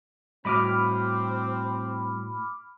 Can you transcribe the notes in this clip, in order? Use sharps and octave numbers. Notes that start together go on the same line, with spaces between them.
A2 G3 C4 F#4 D#5 B5 D6 F6